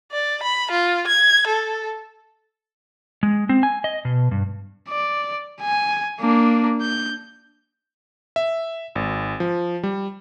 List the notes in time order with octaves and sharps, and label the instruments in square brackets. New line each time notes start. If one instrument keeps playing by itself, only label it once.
[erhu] D5
B5
F4
G#6
A4
[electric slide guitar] G#3
C4
G#5
D#5
B2
G2
[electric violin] D5
G#5
A#3 D4
G6
[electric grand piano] E5
G#1
F3
G3